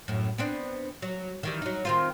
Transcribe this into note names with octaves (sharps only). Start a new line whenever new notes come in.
F#2 A2
B3 C4 D4
F#3
D#3 E3 G3
F#3 D#4
D#3 C4 F4